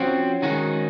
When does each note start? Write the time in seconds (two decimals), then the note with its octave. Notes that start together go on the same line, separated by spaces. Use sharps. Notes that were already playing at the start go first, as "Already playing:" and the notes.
Already playing: F3 C4 C#4 F#4
0.42 D#3 G#3 D#4 F#4